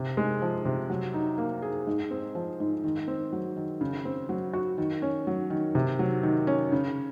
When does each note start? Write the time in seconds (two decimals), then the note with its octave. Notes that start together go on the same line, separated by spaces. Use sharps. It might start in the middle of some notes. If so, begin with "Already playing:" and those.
Already playing: C3
0.17 G#3
0.42 F3
0.65 C3
0.90 F#3
1.14 D#4
1.38 A#3
1.62 G#4
1.87 G#2
2.11 C4
2.35 F3
2.60 G#2
2.84 D#3
3.08 C4
3.33 F#3
3.56 D#3
3.81 C#3
4.05 C4
4.29 F#3
4.53 F#4
4.78 D#3
5.02 C#4
5.27 F#3
5.50 D#3
5.75 C3
5.99 F#3
6.23 D#3
6.47 C#4
6.72 C#3